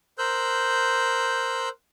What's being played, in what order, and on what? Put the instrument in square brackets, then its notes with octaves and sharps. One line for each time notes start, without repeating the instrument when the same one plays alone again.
[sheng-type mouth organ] A#4 C5 E6 F#6 G6